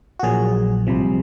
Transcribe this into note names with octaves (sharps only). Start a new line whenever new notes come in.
F#4
A#1 A#2 F#3 G#4
C2 C3 F3